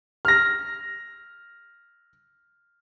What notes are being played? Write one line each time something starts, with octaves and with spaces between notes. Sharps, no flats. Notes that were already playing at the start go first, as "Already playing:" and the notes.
F6 A#6